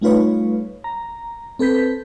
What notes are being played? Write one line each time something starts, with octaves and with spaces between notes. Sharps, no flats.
G3 A3 D#4 F4 B4 C#5
A#5
C4 A4 B4 G6 B6